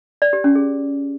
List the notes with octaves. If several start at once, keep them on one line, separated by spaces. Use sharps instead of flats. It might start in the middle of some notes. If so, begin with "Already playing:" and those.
D5
G4
C#4
G#4